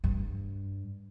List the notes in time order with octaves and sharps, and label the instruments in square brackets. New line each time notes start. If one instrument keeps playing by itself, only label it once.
[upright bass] G2